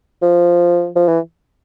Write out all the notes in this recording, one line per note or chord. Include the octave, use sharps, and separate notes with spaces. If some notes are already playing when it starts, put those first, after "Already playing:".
F3
F3
E3